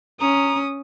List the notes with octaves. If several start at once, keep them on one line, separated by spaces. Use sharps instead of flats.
C#4 A#5 D#6